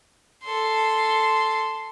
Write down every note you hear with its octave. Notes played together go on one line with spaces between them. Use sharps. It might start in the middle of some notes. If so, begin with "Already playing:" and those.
A4 C6